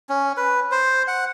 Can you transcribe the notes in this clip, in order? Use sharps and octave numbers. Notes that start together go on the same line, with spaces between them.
C#4
B4
C5
F#5